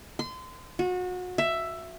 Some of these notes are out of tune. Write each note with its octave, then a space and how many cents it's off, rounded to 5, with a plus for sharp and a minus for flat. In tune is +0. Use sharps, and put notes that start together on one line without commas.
C6 -30
F#4 -30
E5 +10